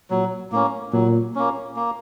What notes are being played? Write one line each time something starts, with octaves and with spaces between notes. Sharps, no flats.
A#2 F#3
A2 A#3 C#4
A#2 F#3
A#3 C#4
A#3